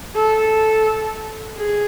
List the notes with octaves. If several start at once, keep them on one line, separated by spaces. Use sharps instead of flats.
A4
G#4